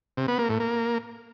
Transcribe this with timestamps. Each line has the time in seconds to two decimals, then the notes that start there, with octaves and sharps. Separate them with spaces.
0.17 C3
0.28 B3
0.39 A#3
0.49 A2
0.60 A#3